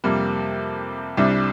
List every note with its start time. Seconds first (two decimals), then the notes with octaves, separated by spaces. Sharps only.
0.04 F2 C3 G3 A#3
1.17 C2 C3 G3 D4